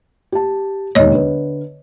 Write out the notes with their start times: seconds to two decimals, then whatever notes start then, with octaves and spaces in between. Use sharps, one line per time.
0.32 G4 A5
0.95 E1 D#2 C#5 D#5
1.12 D3 B4